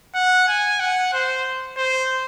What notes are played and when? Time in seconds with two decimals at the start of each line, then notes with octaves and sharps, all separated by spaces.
0.15 F#5
0.48 G#5
0.80 F#5
1.13 C5
1.77 C5